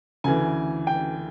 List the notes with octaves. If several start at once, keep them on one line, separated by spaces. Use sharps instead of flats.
D2 C#3 E3 G#5
G5